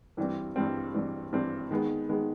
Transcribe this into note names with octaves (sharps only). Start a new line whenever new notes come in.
G2 E3 G3 C4
G2 E3 G3 C4
G2 E3 G3 C4
G2 E3 G3 C4
D#3 G#3 B3
D#3 G#3 B3